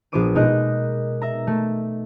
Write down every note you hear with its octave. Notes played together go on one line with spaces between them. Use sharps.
A#1 F3 B3 C5 D6 D#7
B2 G#3 D#4 A#4 D#5 F#6
E5 A#5
A3